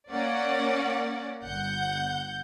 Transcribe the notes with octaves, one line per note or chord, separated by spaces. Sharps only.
A#3 C#4 D5 F#5
G1 F#5 G6